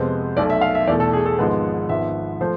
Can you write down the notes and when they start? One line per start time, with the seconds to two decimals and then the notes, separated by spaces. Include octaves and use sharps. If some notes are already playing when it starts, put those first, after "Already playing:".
Already playing: F2 C3 G#3 B3 C5
0.37 B1 B2 A3 D5
0.50 E5
0.61 F5
0.75 E5
0.87 E2 B2 A3 D5
1.00 A4
1.13 G#4
1.26 A4
1.38 G#1 G#2 F3 G#3 B3
1.89 G#1 G#2 F3 B3 E5
2.40 F3 A3 C5